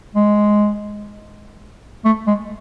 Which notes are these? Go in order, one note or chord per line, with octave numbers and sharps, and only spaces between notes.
G#3
A3
G#3